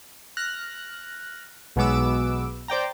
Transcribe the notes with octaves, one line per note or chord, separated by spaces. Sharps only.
F6 F#6 A#6
B1 B2 G#3 B3 D6 E6
C5 D5 G5 A#5